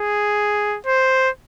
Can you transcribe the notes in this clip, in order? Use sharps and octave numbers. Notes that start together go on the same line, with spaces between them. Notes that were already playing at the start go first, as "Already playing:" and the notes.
Already playing: G#4
C5